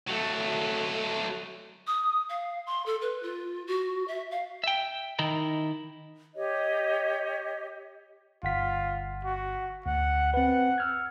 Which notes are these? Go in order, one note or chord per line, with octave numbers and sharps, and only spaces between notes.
F#3 A3
D#6
F5
C6
A4
B4
F4
F#4
E5
F5
E5 G5
D#3 D#4 E4 A#4
G4 C#5 D#5
G1 F4 F#5 B6
F#4
D2 F#5
C4 B4 F#5
E6 F6 G#6